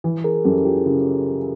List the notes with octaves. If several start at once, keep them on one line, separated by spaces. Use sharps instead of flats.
E3
G#4 A#4
F#2 G4 A4
F4 G4
C#3